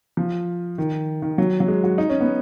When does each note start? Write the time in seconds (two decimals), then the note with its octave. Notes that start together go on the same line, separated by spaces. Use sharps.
0.17 F3
0.78 D#3
1.22 D#3
1.38 F#3
1.60 F#3
1.68 G#3
1.84 F#4
1.98 D#4
2.10 C#4
2.21 B3